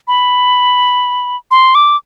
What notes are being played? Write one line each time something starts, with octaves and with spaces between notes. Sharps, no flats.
B5
C6
D6